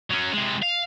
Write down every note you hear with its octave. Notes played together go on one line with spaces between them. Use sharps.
F#3 C#4
C3 G#3
F5